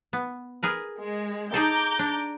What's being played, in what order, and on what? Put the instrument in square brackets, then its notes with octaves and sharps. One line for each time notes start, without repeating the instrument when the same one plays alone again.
[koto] B3
G#4 A#4 B4
[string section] G#3
[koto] D#4 G#4 A4 [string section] A#5 D6 G6
[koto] D4